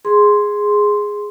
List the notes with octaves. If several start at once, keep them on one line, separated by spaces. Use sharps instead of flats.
G#4 C6